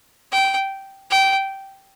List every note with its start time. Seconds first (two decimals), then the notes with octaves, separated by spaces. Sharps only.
0.32 G5
1.10 G5